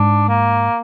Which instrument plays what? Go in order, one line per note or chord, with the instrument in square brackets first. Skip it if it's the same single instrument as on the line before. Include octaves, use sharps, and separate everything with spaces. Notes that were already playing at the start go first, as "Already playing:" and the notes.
Already playing: [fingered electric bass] G#2 [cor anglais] D4
[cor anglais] A#3